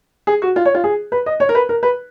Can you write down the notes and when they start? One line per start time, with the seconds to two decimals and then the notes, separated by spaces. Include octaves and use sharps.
0.27 G#4
0.42 F#4
0.56 F4
0.65 C#5
0.75 F4
0.84 G#4
1.12 B4
1.26 D#5
1.40 C#5
1.49 A#4
1.55 B4
1.69 A#4
1.83 B4